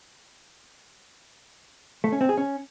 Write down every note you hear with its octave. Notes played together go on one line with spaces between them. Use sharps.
A3
C#4
C4
G#4
C#4